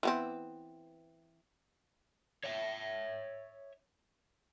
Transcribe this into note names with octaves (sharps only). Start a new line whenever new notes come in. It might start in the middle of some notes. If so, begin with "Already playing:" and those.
E3 B3 C4
C#5 E5